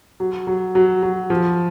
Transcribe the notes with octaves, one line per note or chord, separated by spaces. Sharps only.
F#3
F#3
F#3
F#3
F3